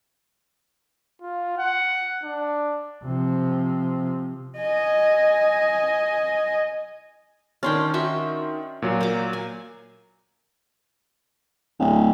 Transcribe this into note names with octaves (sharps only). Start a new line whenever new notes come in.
F4
F#5
D4
C3 F3
D#5 G#5
D#3 C#4 D4 G5 C6 F6
F#4 E5 G5
A#2 F#3
A#3 D6
G#5
D1